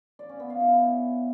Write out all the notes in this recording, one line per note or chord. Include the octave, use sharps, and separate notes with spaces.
D5
C#4
B3
F5
E4